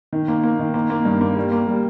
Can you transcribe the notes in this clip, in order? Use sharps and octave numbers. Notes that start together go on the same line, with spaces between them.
D#3
A#3
A#3
D#3
A#3
A#3
G2
A#3
G3
A#3
G3